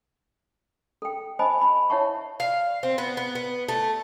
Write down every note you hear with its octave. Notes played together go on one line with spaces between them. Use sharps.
A4 G5
C5 D#5 G#5 A5 B5
B5
E4 C#5 E5 F#5 A5 C#6
F5
C4
B3
B3
B3
A3